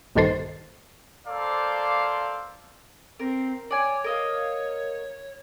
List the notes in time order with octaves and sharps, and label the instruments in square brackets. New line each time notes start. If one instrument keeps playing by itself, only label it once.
[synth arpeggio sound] A#1 G2 D#3 A4 C5
[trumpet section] A#3 A4 C5 D5 F5
[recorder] C4 [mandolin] A#4
[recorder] C#5 [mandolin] D5 G#5
[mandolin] A#4 D#5 F5